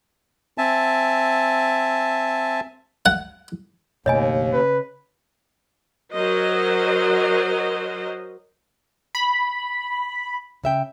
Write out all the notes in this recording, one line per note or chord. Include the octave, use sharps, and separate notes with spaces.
C4 E5 G#5 A5
F#5
F#1 D#2 B2 A3 C#5 D#5 G#5
C#3 B4
F#3 A#4 C5 D#5
B5
C#3 E5 G5